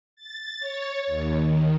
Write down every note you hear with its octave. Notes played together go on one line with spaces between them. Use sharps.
A6
C#5
D#2
D#3